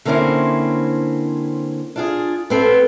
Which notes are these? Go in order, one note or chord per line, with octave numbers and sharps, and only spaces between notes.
D3 A#3 C4 C#4 E4 C5
D4 F4 G#4
B3 C4 A4